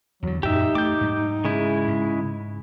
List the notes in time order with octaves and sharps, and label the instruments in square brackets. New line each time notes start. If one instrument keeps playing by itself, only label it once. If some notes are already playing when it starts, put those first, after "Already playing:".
[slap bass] E2 D3 [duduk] F#3
[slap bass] F#2 A#2 [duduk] D#4 [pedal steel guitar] G4 E5
[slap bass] A3 [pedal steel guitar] D6 G6
[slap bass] G#2 F#3
[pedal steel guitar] C#3 G#3 E4
[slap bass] G#2